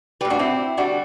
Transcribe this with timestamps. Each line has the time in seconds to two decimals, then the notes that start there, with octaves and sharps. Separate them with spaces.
0.21 G3 G4 B4
0.25 A2
0.30 D4 F#4
0.39 C4 E4
0.77 D3 G3 D4 F#4